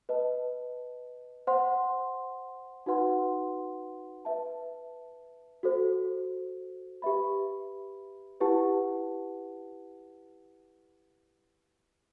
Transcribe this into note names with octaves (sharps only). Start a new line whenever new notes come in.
B4 D#5 A5
C5 F#5 C6
D#4 F#4 B4 F#5 C6
B4 E5 A5
F#4 A4 C5
G4 B4 E5 B5
E4 G4 B4 F#5 A5